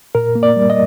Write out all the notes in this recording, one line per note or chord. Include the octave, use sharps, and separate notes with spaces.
A#2 A#4
A#3
D5
G3
D#5